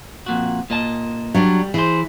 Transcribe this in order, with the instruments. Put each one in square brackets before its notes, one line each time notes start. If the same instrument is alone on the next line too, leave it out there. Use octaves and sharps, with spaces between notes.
[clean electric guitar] F2 A#2 F#4
A#2 D#5 A5
[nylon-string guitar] F#3 D4 [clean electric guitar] G3
[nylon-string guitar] E3 [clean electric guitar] G#4 C5